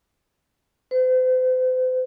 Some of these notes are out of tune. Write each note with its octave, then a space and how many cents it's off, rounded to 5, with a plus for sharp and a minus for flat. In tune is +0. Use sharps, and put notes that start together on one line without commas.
C5 -40